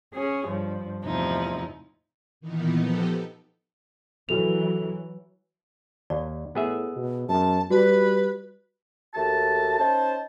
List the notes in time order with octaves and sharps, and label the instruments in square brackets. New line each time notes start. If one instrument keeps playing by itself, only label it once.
[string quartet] C#4 G#4 C#5
G2 F3
E2 A2 C3 F3 D#4 E4
[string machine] A#2 D#3 E3 B3 D#4
F3 B3 D#4 G4 A4
[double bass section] E3 F#3 [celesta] F#4 A4 F7
[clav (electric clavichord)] D#2 [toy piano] D5
[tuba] A2 [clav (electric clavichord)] B3 G#4 E5
[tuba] B2
[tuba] F#2 [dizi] A5
[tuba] G3 [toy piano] F#4 [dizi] B4
[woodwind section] D#2 A3 F#4 A5
C#4 D#4 C5 A5